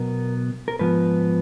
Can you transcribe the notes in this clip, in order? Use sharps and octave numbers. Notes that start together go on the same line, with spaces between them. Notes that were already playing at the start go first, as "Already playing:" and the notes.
Already playing: B2 F#3 B3 A#4
A#4
G#2 F3 B3 B4